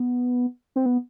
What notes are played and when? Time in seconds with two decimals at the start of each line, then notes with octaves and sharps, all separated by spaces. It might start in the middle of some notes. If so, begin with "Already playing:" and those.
Already playing: B3
0.76 C4
0.86 B3